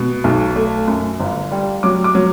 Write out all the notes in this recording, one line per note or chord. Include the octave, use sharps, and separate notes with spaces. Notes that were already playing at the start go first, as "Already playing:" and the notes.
Already playing: B2
B1
A3
F#2
G1
G3
F#3 D6
D6
F#3